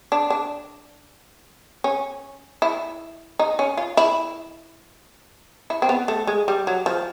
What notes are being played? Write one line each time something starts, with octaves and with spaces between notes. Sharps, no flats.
D4
D4
C#4
E4
D#4
C#4
F4
E4
E4
C4
B3
A3
G#3
G3
F#3
F3